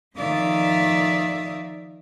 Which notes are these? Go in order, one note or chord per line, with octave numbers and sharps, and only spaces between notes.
D#3 F3 D5 E5 F5 D#6